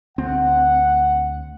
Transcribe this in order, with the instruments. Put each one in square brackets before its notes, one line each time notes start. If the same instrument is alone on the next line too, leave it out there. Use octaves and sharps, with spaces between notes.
[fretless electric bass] D2 C4 [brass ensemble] F#5